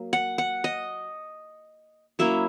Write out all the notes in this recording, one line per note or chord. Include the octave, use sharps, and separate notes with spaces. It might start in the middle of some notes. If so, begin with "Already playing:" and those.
Already playing: F#3 A#3
F#5
F#5
D#5
F#3 A#3 C#4 E4 E5